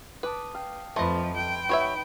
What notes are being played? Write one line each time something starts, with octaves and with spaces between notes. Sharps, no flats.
B4 A5 D6 D#6
F5 G5
F2 F3 A3 B4 D#5 C6
G5
D#4 F#4 B4 C#5 E5